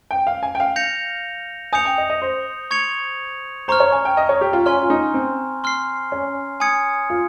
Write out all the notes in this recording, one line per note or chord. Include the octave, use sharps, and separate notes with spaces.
G5
F5
G#5
G5
F5
G6 A#6 C#7 F7
G#5 D#6 G6 C#7 F7
G5
D#5
D#5
C5
C#6 G#6 C#7 F7
C5 A#5 C#6 F6
C#5
G#5
G5
D#5
C#5
G4
F4
C#4 G#5 C6 F6
F4
D#4
C4
C6 F6 C7
C#4
G#5 D#6 G#6 C#7
F4